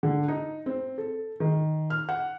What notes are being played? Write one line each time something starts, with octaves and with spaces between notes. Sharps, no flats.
D3
D#4
C4
A4
D#3
F6
F#5